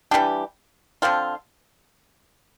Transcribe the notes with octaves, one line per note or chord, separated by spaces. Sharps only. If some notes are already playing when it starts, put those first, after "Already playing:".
E3 G3 D4 G4
D3 F3 C4 F4